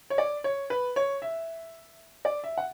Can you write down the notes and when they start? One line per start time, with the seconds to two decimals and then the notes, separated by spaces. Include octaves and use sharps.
0.10 C#5
0.18 D5
0.44 C#5
0.70 B4
0.96 C#5
1.22 E5
2.25 D5
2.44 E5
2.58 F#5